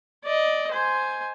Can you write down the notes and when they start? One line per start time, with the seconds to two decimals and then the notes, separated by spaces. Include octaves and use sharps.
0.24 D5 D#5
0.71 C5 G#5